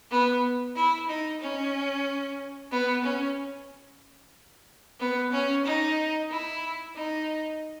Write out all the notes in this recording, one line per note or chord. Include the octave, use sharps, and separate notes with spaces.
B3
E4
D#4
C#4
B3
C#4
B3
C#4
D#4
E4
D#4